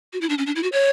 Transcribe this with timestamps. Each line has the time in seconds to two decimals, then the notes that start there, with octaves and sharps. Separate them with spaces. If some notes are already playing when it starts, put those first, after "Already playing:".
0.13 F#4
0.21 E4
0.29 D4
0.38 C#4
0.46 D4
0.56 E4
0.63 F#4
0.72 C#5